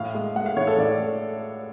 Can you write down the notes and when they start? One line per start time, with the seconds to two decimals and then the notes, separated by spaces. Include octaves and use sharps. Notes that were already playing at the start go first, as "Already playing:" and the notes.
Already playing: A2 F5
0.15 G#3
0.35 G#3 F#5
0.46 F5
0.56 A2 C#5
0.67 A4
0.78 A2 D5